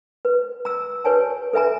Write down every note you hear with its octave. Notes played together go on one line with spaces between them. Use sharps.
B4
A#5 E6
G4 B4 C#5 G#5 A5
A4 B4 E5 G#5 A#5